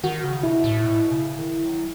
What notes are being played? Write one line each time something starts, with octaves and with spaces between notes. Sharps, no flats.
D#3 F#4
C#3
B2 E4
A2
B2
C#3
D#3
F#3